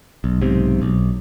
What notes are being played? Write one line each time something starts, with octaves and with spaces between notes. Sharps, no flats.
B1
B1 G#2 C3
B1